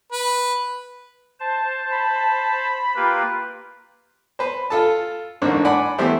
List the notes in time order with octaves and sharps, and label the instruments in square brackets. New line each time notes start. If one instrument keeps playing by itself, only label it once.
[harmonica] B4
[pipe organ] C5 A5
[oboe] B5
[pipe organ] A#3 F4 G4 [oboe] B4
[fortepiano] B4 C5
F4 A4 A5
A1 G#2 D3 A#3 C5 C#5
D5 F#5 G#5 B5 D6
E3 A3 B3 E4 G4 C5